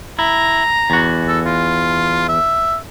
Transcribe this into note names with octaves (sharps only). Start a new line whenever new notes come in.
E4 A#5
E2 F#4
A4
F4
E5